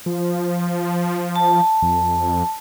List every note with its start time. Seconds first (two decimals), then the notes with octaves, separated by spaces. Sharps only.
0.06 F3
1.36 A5
1.82 F2